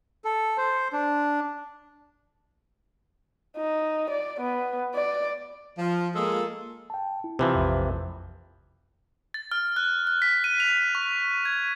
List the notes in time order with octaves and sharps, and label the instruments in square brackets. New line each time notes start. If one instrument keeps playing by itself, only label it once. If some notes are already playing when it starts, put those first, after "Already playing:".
[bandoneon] A4
C5
D4
[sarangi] D#4
D5
B3
D5
[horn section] F3
G#3 A#3 F4 G#4 A4
[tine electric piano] G5 A5
E4
[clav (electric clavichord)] C3 E3 F3 [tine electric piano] C5
[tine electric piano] A#1 F2
[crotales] A6
F6
F#6
F#6
B6
D#7
F7
C#6
G#6